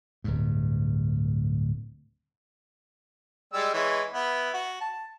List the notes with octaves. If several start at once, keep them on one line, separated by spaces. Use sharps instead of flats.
D1 G2
G3 G#3 E6
E3 G#3 C#5
B3 E4
F#4
A5